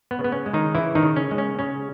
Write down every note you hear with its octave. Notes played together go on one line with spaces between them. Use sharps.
B3
C#3
B3
C#4
G#3
D#3 D#4
C#3 E3 E4
D#3 D#4
C#3
C#4
G#3
C#4
C#3 C#4